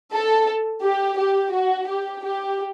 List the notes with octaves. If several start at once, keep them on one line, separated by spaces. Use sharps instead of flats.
A4
G4
G4
F#4
G4
G4